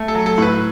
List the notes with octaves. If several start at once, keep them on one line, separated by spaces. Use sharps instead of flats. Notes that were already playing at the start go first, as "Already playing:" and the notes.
Already playing: A3
A4
F#3
A4
A2 B4